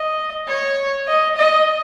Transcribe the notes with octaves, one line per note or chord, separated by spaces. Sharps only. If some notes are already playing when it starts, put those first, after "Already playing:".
Already playing: D#5
C#5
D#5
D#5